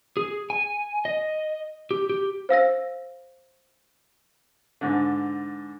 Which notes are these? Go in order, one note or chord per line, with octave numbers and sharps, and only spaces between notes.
G#4
G#5
D#5
G4
G4
C5 F5 E6 A#6
G#2 D3